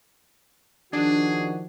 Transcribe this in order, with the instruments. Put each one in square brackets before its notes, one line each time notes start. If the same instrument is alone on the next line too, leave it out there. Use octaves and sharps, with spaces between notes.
[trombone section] D#3 F3 F#4 [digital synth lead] D4 [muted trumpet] G#4